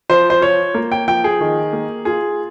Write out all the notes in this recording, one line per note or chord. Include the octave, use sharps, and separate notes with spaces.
F3 C5
C5
F4 C#5
A#3
G5
F3 G5
G#4
D#3
A#3
F4 G#4